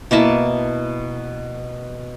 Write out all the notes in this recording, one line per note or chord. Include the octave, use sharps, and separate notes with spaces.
B2 A#3 E4 A5